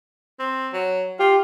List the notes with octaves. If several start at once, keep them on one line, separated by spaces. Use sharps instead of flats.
C4
F#3
F4 G4